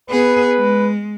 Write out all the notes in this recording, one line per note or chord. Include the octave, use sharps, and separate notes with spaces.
B3 G#4 B4
G#3